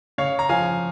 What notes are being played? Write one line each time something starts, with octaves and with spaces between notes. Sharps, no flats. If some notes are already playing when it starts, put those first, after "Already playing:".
C#3 C#5 F5
A#5
F3 F5 G#5